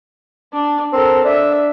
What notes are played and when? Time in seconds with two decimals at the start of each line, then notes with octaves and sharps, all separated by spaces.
0.53 D4
0.93 C4 A4 A#4
1.24 D4 E5